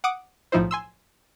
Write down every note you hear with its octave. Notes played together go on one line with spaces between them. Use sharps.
F#5 D6 D#6 D7
B1 A2 F3 D#4 E4 C5
G#5 C6 E6